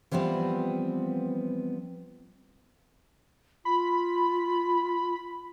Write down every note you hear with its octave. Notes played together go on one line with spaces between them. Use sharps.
E3 F3 G3 B3 C4
F4 B5